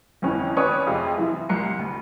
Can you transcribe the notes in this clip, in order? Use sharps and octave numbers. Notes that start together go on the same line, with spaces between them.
G1 F2 E3 C#4
D#2 C#4 B4 C#5 D5 D#6
F2 C3 G#3 F4 G#5 B5
F#2 C3 E3 E4 F4
C2 A#3 A#5 C6 C#7
D2